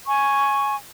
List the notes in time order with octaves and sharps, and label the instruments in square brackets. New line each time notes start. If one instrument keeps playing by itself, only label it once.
[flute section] G#5 C#6